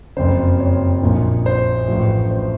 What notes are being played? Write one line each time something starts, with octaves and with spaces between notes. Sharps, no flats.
F#1 F2 C#3 C5
C#5
A#1 A#2 F3
C5
A1 A2 F3
C5